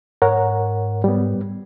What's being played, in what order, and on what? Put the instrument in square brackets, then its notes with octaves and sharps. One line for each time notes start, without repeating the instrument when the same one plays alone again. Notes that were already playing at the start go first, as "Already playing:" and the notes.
[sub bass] G#2 [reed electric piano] A#4 C#5 F#5
[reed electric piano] G3 B3